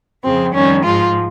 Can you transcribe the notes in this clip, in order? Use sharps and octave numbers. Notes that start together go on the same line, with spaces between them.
F2 C#3 F3 C4
F2 D#3 G3 C#4
G#2 F3 G#3 F4